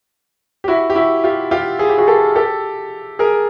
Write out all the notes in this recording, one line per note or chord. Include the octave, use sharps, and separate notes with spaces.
G4
E4 F#4
G4
E4 F#4
F4 G4
F4 G4
G#4
G4
F#4 G#4
G4 A4
G4 A4
G#4 A#4